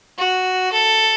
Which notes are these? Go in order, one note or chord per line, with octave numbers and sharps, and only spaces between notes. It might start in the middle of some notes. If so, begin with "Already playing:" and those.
F#4
A4